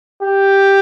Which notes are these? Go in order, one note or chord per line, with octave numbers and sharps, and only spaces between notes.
G4